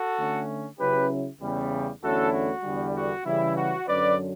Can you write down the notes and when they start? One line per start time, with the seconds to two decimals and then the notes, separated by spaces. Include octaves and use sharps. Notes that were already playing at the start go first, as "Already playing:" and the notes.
Already playing: F#4 A4
0.18 D3 A3 C#4
0.79 C#3 F#3 C#4 E4 G4 B4
1.41 E2 C#3 G3
2.02 E2 D3 A3 C#4 E4 F#4 A4
2.33 F#4
2.64 E2 D3 G3
2.95 F#4
3.25 C#3 E3 G3 E4
3.56 F#4
3.87 F#2 D3 F#3 C#4 B4 D5